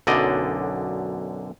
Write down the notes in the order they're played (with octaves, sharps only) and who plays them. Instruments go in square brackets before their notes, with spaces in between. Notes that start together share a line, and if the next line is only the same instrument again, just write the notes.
[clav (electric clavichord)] B1 F#2 D3 D5 D#5